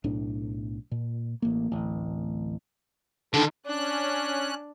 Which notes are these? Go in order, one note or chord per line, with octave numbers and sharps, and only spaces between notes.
B1 A2 D4
A#2
A1 A#3
D1 A1
D3 D#3 A4
C#4 D4 F#6